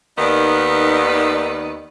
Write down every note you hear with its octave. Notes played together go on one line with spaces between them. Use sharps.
D#2 D#3 B3 D#4 D5